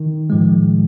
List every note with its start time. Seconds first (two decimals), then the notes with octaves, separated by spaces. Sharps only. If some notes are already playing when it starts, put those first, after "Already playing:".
Already playing: D#3
0.30 A2 F3 G#3